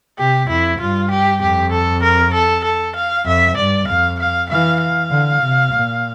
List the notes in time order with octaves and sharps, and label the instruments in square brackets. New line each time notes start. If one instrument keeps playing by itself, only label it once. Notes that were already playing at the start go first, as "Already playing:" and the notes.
[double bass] C3 [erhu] G4
[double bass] F2 [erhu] E4
[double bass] G2 [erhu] F4
[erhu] G4
[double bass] F2 [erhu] G4
[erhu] A4
A#4
A4
A4
F5
[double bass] F2 [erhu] E5
[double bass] G2 [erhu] D5
[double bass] F2 [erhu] F5
[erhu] F5
[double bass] E3 [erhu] F5
[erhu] F5
[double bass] D3
C3
A#2